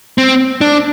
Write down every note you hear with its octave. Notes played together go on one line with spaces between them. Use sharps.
C4
D4